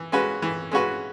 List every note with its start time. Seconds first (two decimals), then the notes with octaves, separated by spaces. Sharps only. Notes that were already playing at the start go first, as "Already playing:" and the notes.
Already playing: E3
0.12 G#3 C#4 F#4 B4
0.42 E3
0.71 G#3 C#4 F#4 B4